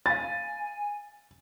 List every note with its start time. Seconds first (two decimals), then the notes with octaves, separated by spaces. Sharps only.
0.06 F5 G#5 B5 A6